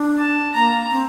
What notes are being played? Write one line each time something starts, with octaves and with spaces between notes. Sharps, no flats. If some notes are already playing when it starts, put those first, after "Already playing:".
Already playing: D4
A5
A#3 A#5
C4